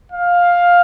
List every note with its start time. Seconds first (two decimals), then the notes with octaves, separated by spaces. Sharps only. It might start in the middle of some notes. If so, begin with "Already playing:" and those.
0.12 F5